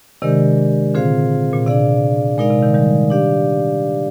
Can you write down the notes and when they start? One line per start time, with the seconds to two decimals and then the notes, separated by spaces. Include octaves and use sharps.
0.22 C3 D#3 G#3 D4 G4 A#4 D5
0.94 A#2 D3 C4 F4 G#4 C5 F5
1.53 A#2
1.66 C3 D4 G#4 D5 F5
2.38 A#2 G#3 D#4 A#4 D5 F5
2.51 C3
2.62 C3 D#3
2.74 D#3 G3
3.10 D4 G4 D5 F5